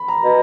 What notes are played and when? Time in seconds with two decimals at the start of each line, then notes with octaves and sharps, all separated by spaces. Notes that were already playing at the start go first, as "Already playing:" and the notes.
Already playing: B5
0.08 A#5
0.24 B2